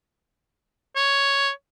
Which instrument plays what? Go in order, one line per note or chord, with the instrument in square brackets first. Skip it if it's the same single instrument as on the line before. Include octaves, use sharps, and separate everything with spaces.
[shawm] C#5